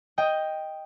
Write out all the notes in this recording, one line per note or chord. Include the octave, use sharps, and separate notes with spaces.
D#5 G5